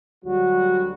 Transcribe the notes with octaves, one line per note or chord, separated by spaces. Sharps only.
D2 D3 F#3 G3 F#4